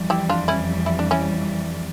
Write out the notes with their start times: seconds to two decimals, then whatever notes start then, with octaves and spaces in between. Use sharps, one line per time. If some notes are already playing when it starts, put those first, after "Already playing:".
Already playing: F2 E3 G3
0.10 E4 G4
0.29 D4 F4
0.48 C#4 E4
0.86 E4
0.99 D4
1.11 C#4 E4